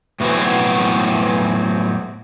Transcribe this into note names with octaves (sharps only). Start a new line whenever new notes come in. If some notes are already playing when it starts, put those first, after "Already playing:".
A2 E3 F#3 B3 C4 F#4